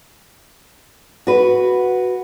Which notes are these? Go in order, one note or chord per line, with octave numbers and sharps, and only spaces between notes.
F#4 B4